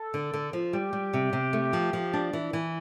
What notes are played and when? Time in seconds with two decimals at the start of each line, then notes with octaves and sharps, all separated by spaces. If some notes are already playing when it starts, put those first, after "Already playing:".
Already playing: A4
0.14 D3
0.33 D3
0.53 F3
0.73 G3 G4
0.93 G3
1.13 C3
1.33 C3
1.53 A3
1.73 F3
1.93 F3
2.13 D4
2.33 E3
2.53 E3